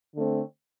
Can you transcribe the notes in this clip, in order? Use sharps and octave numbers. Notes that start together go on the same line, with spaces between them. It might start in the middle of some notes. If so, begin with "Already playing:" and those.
D3 A3 C4